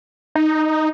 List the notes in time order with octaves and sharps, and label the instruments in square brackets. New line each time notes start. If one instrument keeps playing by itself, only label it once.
[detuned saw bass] D#4